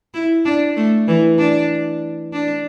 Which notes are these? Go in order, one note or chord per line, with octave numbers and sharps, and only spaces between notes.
E4
D4
A3
E3
D4
D4